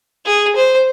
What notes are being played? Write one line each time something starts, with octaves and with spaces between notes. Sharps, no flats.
G#4
C5